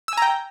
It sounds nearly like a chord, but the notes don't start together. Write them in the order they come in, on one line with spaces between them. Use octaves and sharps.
E6 G#5 A#5 G5